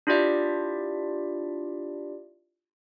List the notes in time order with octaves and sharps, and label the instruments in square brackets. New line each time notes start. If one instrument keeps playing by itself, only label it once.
[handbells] D4 E4 F4 G4 D5 E5